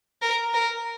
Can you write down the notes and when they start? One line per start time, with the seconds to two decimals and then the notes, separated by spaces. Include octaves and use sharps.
0.22 A#4
0.54 A#4